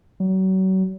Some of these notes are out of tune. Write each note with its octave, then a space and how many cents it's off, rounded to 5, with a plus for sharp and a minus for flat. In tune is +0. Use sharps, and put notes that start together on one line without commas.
F#3 +35